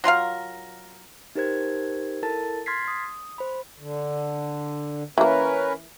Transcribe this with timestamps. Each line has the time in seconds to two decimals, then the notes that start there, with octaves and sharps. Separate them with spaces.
0.04 F#3 F4 A#4 F5
1.35 D#4 G4 A#4 C5 G#6
2.23 E4 A4 A#4 A5 A6
2.66 C6 F6 G#6 A6 B6 C7
2.88 D#6
3.38 C5 B5
3.79 D3
5.18 E3 A#3 C#4 A#4 B4